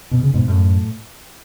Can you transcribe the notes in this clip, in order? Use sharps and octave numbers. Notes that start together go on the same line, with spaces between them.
B2
C#3
G#2 B2
F#2 A2